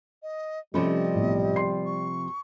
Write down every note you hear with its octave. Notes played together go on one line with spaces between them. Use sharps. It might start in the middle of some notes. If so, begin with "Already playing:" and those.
D#5
C3 F3 G3 A3 C#4 D#5 B5
B1 A2
C6 C7
C#6